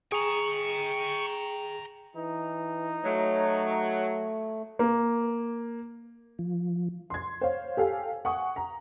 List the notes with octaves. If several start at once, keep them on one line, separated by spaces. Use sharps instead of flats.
G#4 G5 A#5 C#6
E3 D#4
F#3 A3 C#5
A#3
F3
C6 G#6
C5 C#5 F5
G4 A4 F5 G#5
F#5 G#5 C#6 D#6
A#5